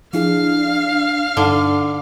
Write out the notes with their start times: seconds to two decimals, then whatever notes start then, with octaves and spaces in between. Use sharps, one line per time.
0.13 F3 D4 E4 G#4 F5
1.37 G2 D3 D4 D#4